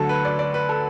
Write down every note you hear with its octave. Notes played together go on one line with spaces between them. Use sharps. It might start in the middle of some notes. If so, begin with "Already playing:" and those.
Already playing: D2 D3 F#3 A4
B4
D5
D5
B4
A4